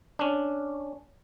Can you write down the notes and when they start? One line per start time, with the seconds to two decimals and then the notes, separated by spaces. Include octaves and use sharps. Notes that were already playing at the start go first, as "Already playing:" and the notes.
0.19 C#4 D4